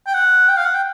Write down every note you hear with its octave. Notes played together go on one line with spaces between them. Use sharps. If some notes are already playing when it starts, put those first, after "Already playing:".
G5
F#5
G5
F5
F#5
G5